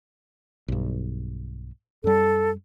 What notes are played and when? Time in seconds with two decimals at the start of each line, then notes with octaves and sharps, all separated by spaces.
0.68 B1 G2
2.04 F#2 G3 A4